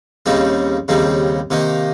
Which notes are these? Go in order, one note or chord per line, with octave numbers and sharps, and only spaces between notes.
D#2 C#3 G3 C4 D#4
D#2 C#3 G3 C4 D#4
C3 D#3 A#3 D#4